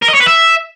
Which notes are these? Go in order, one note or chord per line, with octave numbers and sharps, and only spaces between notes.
A#4
D#5
C#5
B4
E5